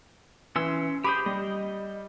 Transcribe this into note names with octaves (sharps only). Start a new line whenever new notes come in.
E3 C#4 C6 E6
G4 G#4 C5 B5
G3 D#5